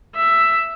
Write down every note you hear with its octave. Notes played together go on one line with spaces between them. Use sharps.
E5